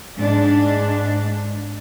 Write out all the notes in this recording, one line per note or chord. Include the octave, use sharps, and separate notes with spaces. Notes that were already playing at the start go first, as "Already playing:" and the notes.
G#2 D4